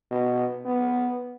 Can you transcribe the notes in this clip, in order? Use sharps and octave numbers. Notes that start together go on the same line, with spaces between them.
B2
B3